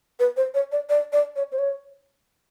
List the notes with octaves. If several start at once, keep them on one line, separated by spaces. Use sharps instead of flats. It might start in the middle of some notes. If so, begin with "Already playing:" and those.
B4
C5
C#5
D5
D5
D5
C#5
C5
C#5